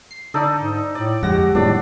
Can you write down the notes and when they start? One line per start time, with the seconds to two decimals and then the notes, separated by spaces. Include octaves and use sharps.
0.11 C7
0.34 D3 D#4 A4 D5 G5
0.59 G#2
0.95 A2 D5
1.23 G1 F2 G#3 F#4 G4 A#6
1.55 A2 D#3 F3 G3 G#3 A#3 D4 D5